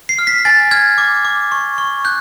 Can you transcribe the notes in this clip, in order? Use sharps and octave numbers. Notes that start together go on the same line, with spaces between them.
C7
F6
B6
G#5 A6
F6 G#6
D6
D6
C#6
C#6
F#6 G6